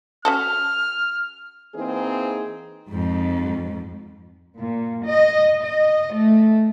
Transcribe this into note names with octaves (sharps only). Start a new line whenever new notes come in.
C#4 F#4 A4 F6
E3 A#3 C4 D#4 G#4
F2 G#2
A#2
D#5
D#5
A3